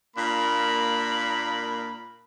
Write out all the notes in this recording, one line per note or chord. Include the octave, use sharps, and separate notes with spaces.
A#2 A#3 D4 A#4 B5